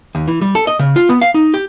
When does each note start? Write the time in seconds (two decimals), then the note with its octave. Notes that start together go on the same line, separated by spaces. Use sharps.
0.15 D#2
0.28 E3
0.41 G3
0.55 A4
0.67 D#5
0.79 C#3
0.96 F4
1.09 B3
1.21 F5
1.34 D#4
1.54 G4